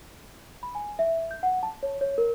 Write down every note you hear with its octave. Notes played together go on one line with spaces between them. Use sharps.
B5
G#5
E5
G6
F#5
A5
C#5
C#5
A#4